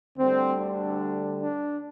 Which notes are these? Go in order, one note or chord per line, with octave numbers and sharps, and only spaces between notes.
D2 D3 G3 C4
D4
D4